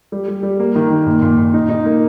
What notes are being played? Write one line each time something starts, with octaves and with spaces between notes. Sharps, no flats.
G3
G3
G3
A#3
D#3
D#3
A#2
A#2
A#2
D#4
D#4
A#3